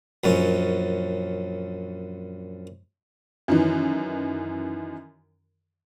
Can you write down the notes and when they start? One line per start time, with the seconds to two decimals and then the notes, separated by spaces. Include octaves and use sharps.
0.24 A#1 F#2 C#4
3.48 F#2 D#3 E3